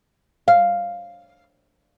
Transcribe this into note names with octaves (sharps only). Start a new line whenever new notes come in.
F5